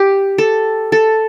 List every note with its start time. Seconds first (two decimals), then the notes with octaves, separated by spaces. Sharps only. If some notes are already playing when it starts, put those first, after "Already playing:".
Already playing: G4
0.38 A4
0.92 A4